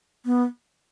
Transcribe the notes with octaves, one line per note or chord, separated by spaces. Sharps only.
B3